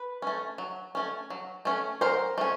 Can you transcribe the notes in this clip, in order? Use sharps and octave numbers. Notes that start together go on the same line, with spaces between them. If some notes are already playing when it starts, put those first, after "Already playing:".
Already playing: B4
A3 C#4
F#3
A3 C#4
F#3
A3 C#4
F#3 A#4 C5
A3 C#4